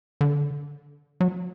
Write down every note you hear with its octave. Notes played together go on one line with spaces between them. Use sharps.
D3
F#3